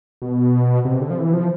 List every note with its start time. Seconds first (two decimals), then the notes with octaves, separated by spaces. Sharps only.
0.22 B2
0.85 C3
1.01 D3
1.10 F3
1.18 E3
1.33 F3